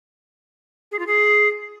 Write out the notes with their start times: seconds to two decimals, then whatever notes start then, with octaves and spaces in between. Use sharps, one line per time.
0.92 G#4
0.99 F4
1.07 G#4